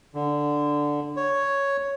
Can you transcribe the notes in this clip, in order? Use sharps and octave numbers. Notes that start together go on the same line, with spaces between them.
D3
C#5